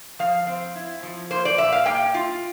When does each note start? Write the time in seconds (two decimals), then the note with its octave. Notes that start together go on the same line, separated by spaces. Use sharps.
0.19 F3 F5
0.47 C4
0.75 E4
1.03 F3
1.30 A#3 C5
1.45 D5
1.58 A#2 E5
1.72 F5
1.86 A#3 G5
2.14 F4